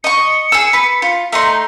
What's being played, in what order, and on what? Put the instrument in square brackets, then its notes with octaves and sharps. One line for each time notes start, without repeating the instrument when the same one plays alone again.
[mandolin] D#5 C#6 [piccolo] C#7
[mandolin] G#4 E6
B4
F4
[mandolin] A3 D#4 C6 [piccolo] A#5